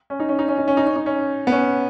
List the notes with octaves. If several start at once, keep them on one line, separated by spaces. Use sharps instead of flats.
C#4
D#4
C#4
D#4
C#4
D#4
C#4
D#4
C#4
D#4
C#4
B3
C#4